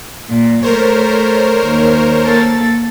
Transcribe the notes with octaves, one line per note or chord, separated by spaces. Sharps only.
A#2
A3 A#4 C5 C#5
D#2
A#3 A4 A6